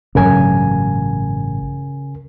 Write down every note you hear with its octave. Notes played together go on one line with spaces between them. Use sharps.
A1 G2 C#3 F#3 A#4 G#5